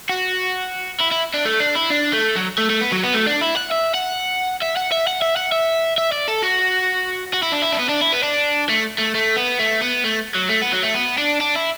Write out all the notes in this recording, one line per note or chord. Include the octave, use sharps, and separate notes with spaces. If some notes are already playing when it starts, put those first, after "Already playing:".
F#4
E4
E4
D4
A3
D4
E4
D4
A3
F#3
A3
A3
B3
F#3
B3
A3
D4
E4
F#5
E5
F#5
E5
F#5
E5
F#5
E5
F#5
E5
E5
D5
A4
F#4
F#4
E4
D4
E4
D4
B3
D4
E4
B3
D4
A3
A3
A3
B3
A3
B3
A3
F#3
A3
B3
F#3
A3
B3
D4
D4
E4